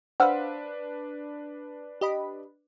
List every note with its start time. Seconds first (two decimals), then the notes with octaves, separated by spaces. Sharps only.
0.20 D4 B4 C5 F5 F#5 B5 E6 F6
2.01 G4 D#5 B5